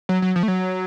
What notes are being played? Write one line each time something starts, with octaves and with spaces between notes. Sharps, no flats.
F#3
F#3
F3
A3
F#3